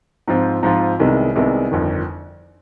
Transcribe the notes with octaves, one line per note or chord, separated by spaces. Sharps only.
G#2 F3 C4 F4
G#2 F3 C4 F4
C2 C3 D#3 G#3 B3
C2 C3 D#3 G#3 B3
G1 F2 D#3